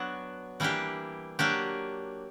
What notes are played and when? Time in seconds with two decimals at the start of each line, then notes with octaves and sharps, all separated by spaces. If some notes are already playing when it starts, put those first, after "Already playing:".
Already playing: F#3 B3 D4
0.60 E3 G3 A#3 D4 G4
1.39 F#3 A#3 D4 G4